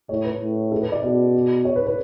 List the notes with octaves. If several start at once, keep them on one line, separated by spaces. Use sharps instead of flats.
A2 C#5
B4
A2
A4
B4
D5
B2 D5
C#5
B4
B4